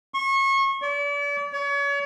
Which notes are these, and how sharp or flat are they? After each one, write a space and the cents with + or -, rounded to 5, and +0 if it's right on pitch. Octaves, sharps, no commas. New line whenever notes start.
C#6 -30
D5 -40
C#5 +35